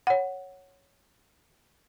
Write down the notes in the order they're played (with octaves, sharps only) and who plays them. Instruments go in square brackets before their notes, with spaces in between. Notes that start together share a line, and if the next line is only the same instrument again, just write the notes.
[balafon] C#5 F#5